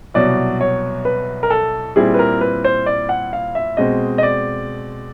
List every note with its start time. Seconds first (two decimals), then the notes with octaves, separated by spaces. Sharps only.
0.14 C2 B2 F#3 D5
0.61 C#5
1.05 B4
1.43 A#4
1.50 A4
1.96 A#2 G3 C4 E4 G#4
2.14 B4
2.19 A#4
2.41 B4
2.64 C5
2.86 D5
3.09 F#5
3.33 F5
3.55 E5
3.77 B2 G#3 C4 D#5
4.18 D#5
4.23 D5